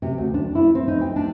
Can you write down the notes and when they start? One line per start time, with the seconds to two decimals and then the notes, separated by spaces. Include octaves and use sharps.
0.02 C3
0.18 D2
0.34 D4
0.55 E4
0.75 C4
0.88 D#4
1.01 G5
1.16 D4